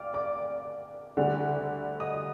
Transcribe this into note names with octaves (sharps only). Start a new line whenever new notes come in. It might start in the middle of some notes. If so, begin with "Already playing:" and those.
Already playing: D2 D5 F5 G5 D6 F6
D5 D6
D2 D3 G3 D4
D#5 D#6